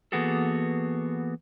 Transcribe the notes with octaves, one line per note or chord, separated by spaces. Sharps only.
E3 A#3 B3 F#4 G#4 A4